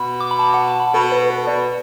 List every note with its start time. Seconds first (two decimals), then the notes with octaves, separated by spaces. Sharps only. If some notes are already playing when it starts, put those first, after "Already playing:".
Already playing: B2 B5
0.20 D6
0.31 B5
0.39 A5
0.54 F#5
0.67 A5
0.80 B5
0.94 B2 A4
1.12 B4
1.30 B4
1.47 B2 D5